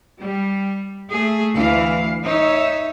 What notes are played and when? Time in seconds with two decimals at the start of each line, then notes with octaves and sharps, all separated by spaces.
0.20 G3
1.10 A3 G#4
1.56 D2 E3 F5
2.24 D#4 C#5 E5